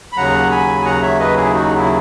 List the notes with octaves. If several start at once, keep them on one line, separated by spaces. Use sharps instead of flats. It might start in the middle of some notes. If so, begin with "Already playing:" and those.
B5
D#2 C#3 F#3 F#5 A#5
G#5 B5
G#5
F#5 A#5
C#5 E5
B4 D#5
E4 G#4
D#4 F#4
E4